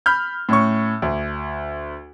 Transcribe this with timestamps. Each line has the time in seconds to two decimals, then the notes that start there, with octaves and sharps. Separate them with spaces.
0.06 B5 F6 G6
0.49 A2 C#4 C#6
1.02 D2